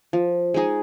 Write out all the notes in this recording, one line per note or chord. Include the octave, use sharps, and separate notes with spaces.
F3
G#3 D#4 G#4